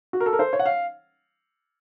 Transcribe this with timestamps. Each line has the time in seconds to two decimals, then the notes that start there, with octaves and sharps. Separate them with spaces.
0.13 F#4
0.20 A#4
0.26 A4
0.33 A#4
0.39 C5
0.53 C#5
0.59 F#5
0.66 F5